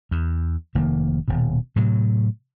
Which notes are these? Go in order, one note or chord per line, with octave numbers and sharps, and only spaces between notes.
E2
F1 D#3 A#3
D#1 B2
A2 C3 F#3